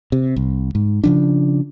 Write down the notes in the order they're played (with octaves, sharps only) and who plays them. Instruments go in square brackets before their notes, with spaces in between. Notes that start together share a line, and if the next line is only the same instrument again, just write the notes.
[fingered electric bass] C3
C2
G#2
C#3 F3 D4